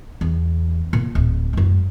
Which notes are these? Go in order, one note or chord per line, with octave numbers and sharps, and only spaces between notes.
E2
A#2
D1
F#2 G#3